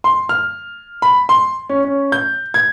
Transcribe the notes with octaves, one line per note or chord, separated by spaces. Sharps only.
C6
F6
B5
C6
C#4
C#4
G6
G#6